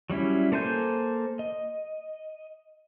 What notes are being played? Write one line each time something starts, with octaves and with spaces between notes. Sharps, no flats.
F#3 G3 C#4 E4
A#3 A4 C5 G#5 G6
D#5